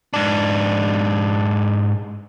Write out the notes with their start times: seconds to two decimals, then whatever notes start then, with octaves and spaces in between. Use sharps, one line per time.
0.14 G#2 D4